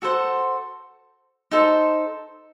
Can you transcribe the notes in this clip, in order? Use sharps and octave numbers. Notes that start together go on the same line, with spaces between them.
F#4 A4 C5 F#5
D#4 A4 C5